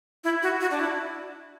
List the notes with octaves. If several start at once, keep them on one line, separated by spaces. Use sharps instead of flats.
E4
F#4
F#4
D4
E4